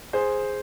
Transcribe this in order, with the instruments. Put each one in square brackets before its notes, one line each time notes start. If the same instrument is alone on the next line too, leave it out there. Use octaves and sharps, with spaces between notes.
[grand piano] G#4 C5